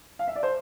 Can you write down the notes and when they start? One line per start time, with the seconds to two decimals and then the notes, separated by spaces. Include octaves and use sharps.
0.19 F5
0.28 E5
0.36 D5
0.43 C5